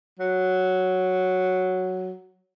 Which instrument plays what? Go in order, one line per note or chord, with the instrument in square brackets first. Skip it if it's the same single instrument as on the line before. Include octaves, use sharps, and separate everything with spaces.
[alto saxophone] F#3